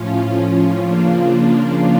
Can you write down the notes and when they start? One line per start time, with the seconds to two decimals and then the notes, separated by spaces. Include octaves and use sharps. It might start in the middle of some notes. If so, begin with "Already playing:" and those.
Already playing: A2 F3 C#4 F4
0.78 C#3 F3 A#3 D4 F4